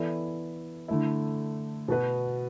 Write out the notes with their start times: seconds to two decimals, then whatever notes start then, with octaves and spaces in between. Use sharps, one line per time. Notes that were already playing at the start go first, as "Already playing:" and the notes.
Already playing: E3 B3 E4 A4 D5
0.88 D3 A3 E4
1.88 B2 B3 F#4 B4